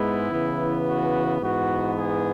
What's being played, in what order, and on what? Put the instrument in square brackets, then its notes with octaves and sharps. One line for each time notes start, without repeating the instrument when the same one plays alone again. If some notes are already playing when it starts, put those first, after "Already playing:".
Already playing: [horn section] G#2 G#3 B3 E4
C#3 E3 B3
F#4
G#2 E3 B3 F#4
G#4